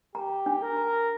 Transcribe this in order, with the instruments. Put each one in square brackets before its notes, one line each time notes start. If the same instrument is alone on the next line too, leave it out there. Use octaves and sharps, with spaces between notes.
[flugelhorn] G4 [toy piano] A#5
[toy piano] D4
[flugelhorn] A#4
[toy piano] A#5